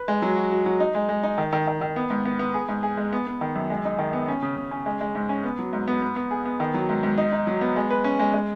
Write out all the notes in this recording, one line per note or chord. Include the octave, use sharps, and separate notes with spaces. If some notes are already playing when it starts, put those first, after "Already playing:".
Already playing: B4
G#3
F#3
F#4
F#4
F#3
D#4
G#3
G#3
D#4
D#3
D#3
D#3
D#3
B3
G#2
B3
B3
G#4
G#2
G#4
G#3
B3
B3
D#3
F#2
G#3
D#4
D#3
B3
C#4
C#3
C#3
C#4
G#3
G#3
G#2
C#4
B3
F#3
G#2
B3
B3
B3
G#4
B3
D#3
F#3
G#2
G#2
D#4
D#4
F#3
B3
G#3
B4
C#4
G#3
G#3